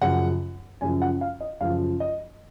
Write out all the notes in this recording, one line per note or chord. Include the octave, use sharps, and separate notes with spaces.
F#2 C#3 F3 F#5
F#2 C#3 F3 G#5
F#5
F5
D#5
F#2 C#3 F3 F5
D#5